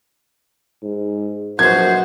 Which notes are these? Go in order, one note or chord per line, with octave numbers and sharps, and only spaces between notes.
G#2
A#1 F#2 B2 F#4 C5 G#6